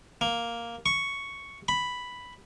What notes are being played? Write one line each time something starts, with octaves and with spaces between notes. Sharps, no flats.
A#3
C#6
B5